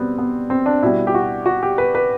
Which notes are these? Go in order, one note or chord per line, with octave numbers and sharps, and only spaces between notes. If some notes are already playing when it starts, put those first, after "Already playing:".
Already playing: B2 G3 B3 C4
B3
C4
D4
B2 G3 E4
G4
F#4
F#4
G4
B4
B4